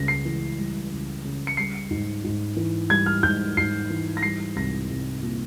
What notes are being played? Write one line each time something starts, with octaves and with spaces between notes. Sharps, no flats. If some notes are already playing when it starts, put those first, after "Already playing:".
Already playing: C#2 C#3 G3 A#6
C7
E3
G3
C#2
C#3
C#7
G3 C7
G#2
G#2
E3
G3 G#6
F6
G#2 G6
G#2 C7
E3
A#6
G3 C7
C2 A#6
C2
A#2